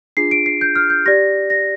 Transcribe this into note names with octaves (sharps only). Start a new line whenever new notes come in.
D4 F4 G#4 C7
D7
C7
G6
F6
G6
G4 D5 A#6
A#6